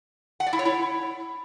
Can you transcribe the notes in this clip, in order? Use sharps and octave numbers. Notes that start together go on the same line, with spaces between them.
F#5
D5
E4
C#5
E4